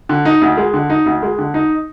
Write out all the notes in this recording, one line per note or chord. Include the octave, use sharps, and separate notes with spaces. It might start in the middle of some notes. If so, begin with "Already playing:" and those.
D3
D#4
D2
G#3
D3
D#4
D2
G#3
D3
D#4